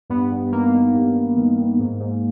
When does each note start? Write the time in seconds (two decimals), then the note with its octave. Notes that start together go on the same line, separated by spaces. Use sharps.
0.10 G2 B3
0.32 G2
0.52 D#3 A#3
0.74 D#3
0.94 G2
1.16 G2
1.37 D#3
1.58 D#3
1.79 G#2
2.00 G#2